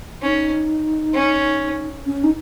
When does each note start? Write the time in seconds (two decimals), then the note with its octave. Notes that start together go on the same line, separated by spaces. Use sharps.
0.22 C#4 D#4
1.14 C#4
2.06 C#4
2.24 D#4